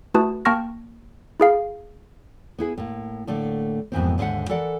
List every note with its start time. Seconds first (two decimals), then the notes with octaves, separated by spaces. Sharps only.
0.14 A3 E4 F#4 B4 A5 D#6
0.45 A#3 G5 A5 C#6 F6 A#6
1.40 E4 G#4 F5
2.59 B3 E4 G#4
2.78 A2 A#3
3.27 A2 D3 A3 A#3
3.92 F2 G#2 B2 E3 A#3 C4
4.18 D#2 G#2 D3 E5 F#5
4.49 E3 A4 A#4 D5 F#5